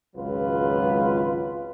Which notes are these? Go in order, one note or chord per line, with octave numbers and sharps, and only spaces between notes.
G#1 C#2 F#3 F4 B4